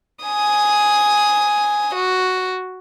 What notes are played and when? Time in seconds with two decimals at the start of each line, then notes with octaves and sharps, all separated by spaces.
0.24 G#5 D#6
1.95 F#4